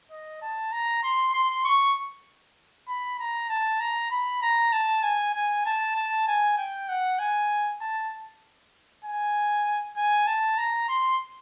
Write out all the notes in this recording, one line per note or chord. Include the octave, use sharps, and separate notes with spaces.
D#5
A5
A#5
C6
C6
C#6
B5
A#5
A5
A#5
B5
A#5
A5
G#5
G#5
A5
A5
G#5
G5
F#5
G#5
A5
G#5
G#5
A5
A#5
C6